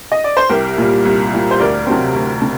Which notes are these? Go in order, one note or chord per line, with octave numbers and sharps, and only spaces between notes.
D#5
D5
C5
C2 G4 A#4
A#2 G3
C2
A#2 G3
C5
D2 A#4 D5
C3 F#3 C4
D2
C3